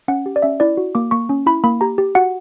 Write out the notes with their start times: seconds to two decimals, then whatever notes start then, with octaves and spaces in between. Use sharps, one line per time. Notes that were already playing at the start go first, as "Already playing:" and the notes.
0.08 C#4 F#5
0.26 G4
0.36 D5
0.42 C#4 E5
0.60 E4 D5
0.77 F#4
0.95 A#3 D6
1.11 A#3 C#6
1.29 C#4
1.46 E4 B5
1.64 A#3 B5
1.81 G4 A#5
1.98 G4
2.15 F#4 F#5